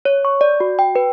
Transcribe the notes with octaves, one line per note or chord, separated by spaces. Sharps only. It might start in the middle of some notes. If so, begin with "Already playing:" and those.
C#5
C#6
D5
F#4
G5
B4